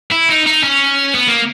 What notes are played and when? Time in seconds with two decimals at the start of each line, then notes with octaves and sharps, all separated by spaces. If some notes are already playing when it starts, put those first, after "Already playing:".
0.12 E4
0.29 D#4
0.47 D#4
0.64 C#4
1.15 B3
1.28 A#3